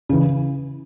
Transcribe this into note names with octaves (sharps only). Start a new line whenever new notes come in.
C#3 E3